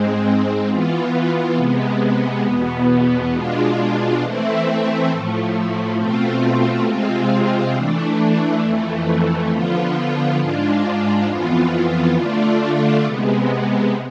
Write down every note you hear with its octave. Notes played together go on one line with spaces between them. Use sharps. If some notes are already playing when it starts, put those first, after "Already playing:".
Already playing: G#2 G#3 C4
E3 B3 F4
C3 G#3 B3
E2 B2 B3
B2 G#3 D4 F4
E3 A3 C4 E4
A2 F3 A3
B2 A3 C4 F4
C3 G#3 C4 F4
E3 A3 D4
F2 E3 A3
D3 F3 B3 F4
G#2 G#3 D4 F4
F2 E3 B3 F4
D3 A3 D4 F4
C3 G#3 B3